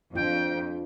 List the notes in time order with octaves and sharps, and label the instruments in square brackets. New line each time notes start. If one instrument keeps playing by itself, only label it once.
[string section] F2 [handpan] D4 F4 [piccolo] G5